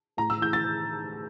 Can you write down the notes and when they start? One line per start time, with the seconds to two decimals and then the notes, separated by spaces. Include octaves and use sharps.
0.17 A2 A#5
0.30 E6
0.41 E3 G6
0.53 A6